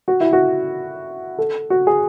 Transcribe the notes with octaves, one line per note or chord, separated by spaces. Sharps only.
F#4
E4
F#4
A4
F#4
G#4